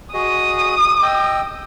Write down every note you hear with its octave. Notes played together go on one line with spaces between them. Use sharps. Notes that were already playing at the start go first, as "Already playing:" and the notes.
F#4 G#4 D#5 D#6
D#5 G5 E6